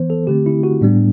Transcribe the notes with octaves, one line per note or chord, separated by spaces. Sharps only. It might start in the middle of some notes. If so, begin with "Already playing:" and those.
Already playing: E3 B3 C5
A4
D3 A3 C4 G4
E4
F#4
A2 G3 B3 D4